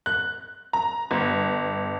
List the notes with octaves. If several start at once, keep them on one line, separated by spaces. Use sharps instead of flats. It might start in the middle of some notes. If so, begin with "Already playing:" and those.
F#6
A#5
G1